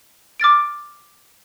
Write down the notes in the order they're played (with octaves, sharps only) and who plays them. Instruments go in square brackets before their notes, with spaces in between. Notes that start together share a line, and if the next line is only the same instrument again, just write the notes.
[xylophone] D6 F6 A6 D7